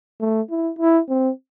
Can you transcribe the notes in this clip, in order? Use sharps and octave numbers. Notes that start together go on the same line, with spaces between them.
A3
E4
E4
C4